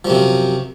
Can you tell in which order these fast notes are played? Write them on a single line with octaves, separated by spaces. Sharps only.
F3 F#2 C3